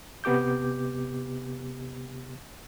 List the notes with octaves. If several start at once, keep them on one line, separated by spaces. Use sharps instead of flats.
C3 B3 G4 D6 G6